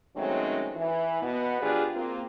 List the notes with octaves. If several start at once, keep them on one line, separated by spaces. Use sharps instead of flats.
D#3 F#3 G#3 A3 C4 C#4
E3
B2 B3
F3 D4 F4 G4 G#4 B4
A#3 C4 F4